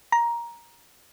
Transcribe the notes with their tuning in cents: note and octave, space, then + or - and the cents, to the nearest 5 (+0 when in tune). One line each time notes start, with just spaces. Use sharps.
A#5 +10